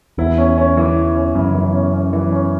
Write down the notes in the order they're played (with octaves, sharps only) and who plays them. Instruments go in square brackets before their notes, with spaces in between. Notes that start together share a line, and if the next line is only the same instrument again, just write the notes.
[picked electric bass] E2 [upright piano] E4
[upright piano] C#4
C#4
E3
E4
C#4
[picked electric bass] F#2 [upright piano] C#3
[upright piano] E3
C#4
C#4
E3
C#4